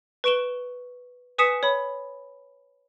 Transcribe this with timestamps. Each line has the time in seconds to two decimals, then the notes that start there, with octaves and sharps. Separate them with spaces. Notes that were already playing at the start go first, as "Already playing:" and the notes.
0.24 B4 C#6 D7 E7 G7
1.38 B4 G#5 D#6 B6 C#7 E7
1.63 C#5 B5